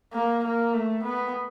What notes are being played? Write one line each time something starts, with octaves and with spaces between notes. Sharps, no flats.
A#3
A#3
A3
B3